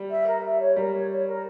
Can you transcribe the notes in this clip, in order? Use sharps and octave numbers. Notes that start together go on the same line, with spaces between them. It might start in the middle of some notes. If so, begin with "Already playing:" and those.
Already playing: G3
E5
A#4
E5
C#5
G3 A#4
C#5
C#5
A#4